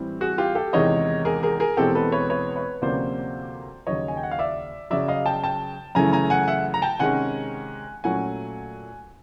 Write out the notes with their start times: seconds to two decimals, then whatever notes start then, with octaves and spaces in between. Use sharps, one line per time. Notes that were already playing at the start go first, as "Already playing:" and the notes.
Already playing: A2 E3 G3 C4
0.21 F#4 G#4
0.38 F4 G4
0.55 G4 A4
0.73 E2 C3 D#3 G#3 C#5 D#5
1.25 G#4 A#4
1.43 G#4 A#4
1.60 G#4 A#4
1.77 E2 B2 G#3 C4 G4 A4
1.95 A4 B4
2.12 B4 C#5
2.30 B4 C#5
2.56 B4 C#5
2.82 D2 C3 F3 A#3 C#4 C5 D5
3.87 D#2 C#3 F#3 C#5 D#5
4.08 G#5
4.17 G5
4.23 F#5
4.31 F5
4.39 D5 E5
4.90 F#2 C#3 F#3 D5 E5
5.08 D#5 F5
5.26 G5 A5
5.44 G5 A5
5.95 F#2 C#3 E3 A3 G#5 A#5
6.13 G#5 A#5
6.30 F#5 G#5
6.48 E5 F#5
6.74 A#5
6.82 G5 A5
6.99 C3 D#3 G#3 C#4 F#5 G#5
8.04 A#2 F#3 A3 C#4 F#5 G#5